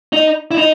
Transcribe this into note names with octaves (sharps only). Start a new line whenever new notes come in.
D#4
E4
D#4